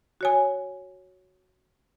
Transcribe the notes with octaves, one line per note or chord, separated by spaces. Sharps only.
F#4 C#5 G#5